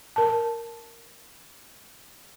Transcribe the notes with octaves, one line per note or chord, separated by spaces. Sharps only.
A#4 A5